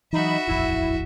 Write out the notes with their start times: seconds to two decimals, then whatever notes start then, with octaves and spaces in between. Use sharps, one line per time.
0.13 E3 F#3 D#4 F#4 E5 B5
0.47 D#1 A1 F2 E4